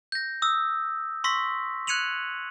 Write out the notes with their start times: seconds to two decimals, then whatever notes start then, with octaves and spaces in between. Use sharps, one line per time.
0.12 G6 A#6
0.42 D#6 E6
1.24 C6 C#6 E6 A#6 B6
1.87 F#6 G#6 C#7 D#7 F7 F#7